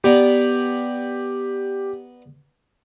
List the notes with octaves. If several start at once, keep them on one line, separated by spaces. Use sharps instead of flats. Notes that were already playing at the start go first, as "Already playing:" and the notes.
B3 G4 D5 A#5